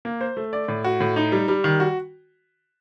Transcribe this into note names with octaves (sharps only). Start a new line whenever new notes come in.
A#3
C5
A3
D5
A2
F#4
A2
D#4
G3
G3
D#3
F#4